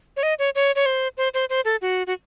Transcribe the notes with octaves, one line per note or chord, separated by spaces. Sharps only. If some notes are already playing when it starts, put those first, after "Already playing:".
C#5
D#5
C#5
C#5
C#5
C5
C5
C5
C5
A4
F#4
F#4